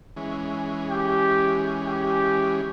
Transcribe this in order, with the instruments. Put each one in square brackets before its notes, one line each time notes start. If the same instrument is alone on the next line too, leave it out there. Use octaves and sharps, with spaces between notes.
[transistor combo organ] E3 G#3 C#4
[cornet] G4
G4